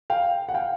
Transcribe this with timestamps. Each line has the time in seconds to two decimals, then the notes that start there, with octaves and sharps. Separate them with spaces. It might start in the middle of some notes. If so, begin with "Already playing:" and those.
0.10 F5 G5
0.49 F#5
0.54 F5 G5